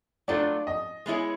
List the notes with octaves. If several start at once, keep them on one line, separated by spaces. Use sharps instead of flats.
F#3 A3 D4 F4 D5
D#5
G#3 B3 E4 G#4 C#5